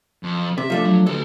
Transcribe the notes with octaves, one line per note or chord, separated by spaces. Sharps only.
F2
C3 E5
F3 A3 D4
F#3
D2 A4 B4